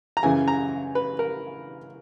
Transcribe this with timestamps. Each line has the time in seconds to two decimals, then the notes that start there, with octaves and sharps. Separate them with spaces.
0.17 A#5
0.23 F#2 C#3 E3 G#5
0.48 A#5
0.95 B4
1.19 A#4